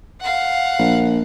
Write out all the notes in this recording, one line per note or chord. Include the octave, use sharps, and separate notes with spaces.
F5 F#5
A#1